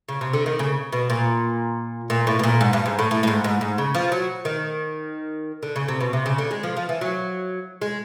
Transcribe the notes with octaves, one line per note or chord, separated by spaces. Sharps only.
C#3
C3
D3
D#3
C#3
B2
A#2
A#2
A2
B2
A#2
G#2
G2
G#2
A2
A2
A2
G#2
G#2
G#2
C#3
F3
F#3
D#3
D3
C#3
C3
B2
C3
C#3
D3
G#3
F3
F3
E3
F#3
G#3